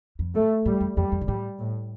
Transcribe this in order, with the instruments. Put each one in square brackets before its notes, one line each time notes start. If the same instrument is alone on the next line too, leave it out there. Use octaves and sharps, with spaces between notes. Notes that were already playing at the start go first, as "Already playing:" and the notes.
[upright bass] F2
[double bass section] A3
[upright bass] A2 [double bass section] G3
[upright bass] F2
[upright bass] F2 [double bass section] G3
[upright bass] F2
B2
[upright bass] A2 [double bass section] G3
[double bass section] A2